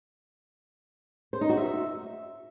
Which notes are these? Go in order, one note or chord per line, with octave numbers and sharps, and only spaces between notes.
C5
D#4
F#4
E5